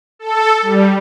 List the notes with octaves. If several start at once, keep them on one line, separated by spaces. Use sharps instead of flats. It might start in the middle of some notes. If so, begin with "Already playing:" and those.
A4
G3